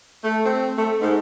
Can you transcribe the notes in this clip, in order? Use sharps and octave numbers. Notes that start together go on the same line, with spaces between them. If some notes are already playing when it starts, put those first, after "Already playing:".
A3
C4
A3
G#2